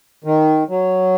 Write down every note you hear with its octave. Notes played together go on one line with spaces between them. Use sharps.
D#3
F#3